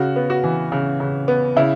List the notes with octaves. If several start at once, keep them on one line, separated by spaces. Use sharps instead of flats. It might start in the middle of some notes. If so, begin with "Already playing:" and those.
Already playing: C#3 F#4
B3
F#4
E3
C#3
C#3
B3
C#3 E4